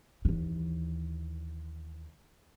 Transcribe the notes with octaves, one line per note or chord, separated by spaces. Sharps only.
D#2 E3